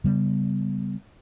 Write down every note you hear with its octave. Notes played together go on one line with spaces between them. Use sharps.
C#3 G3 B3